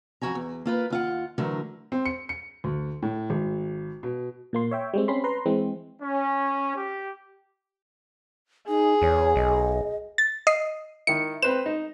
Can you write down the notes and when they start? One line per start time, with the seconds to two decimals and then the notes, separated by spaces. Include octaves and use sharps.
0.21 F2 F#4 G#5 A#5
0.35 E2
0.65 A#3 F4 B4
0.90 D#2 F4 F#5
1.38 D3 E3 F#3 A3 F#4 A#4
1.92 C4
2.06 C#7
2.29 C#7
2.64 D2
3.02 A2
3.30 G#1
4.03 B2
4.53 A#2 A#3 C6
4.71 C#5 E5 G5
4.94 G3 G#3 C4
5.08 C4 C#4 B5 C6
5.24 B4 A#5 C6
5.46 E3 G#3 C4
6.01 C#4
6.76 G4
8.69 D#4 G#4
9.02 E2 C#5
9.36 B1 D#5
10.18 A6
10.47 D#5 C7
11.07 D#3 E4 C#7
11.42 C4 B4 C5 E7
11.66 D#4